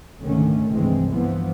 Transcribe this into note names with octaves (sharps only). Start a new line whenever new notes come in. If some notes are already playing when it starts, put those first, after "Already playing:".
C#2 G#2 D3 D#3 A3 C#4
F1 C2 G2 E3 G#3 C4
G2 E3 F3 B3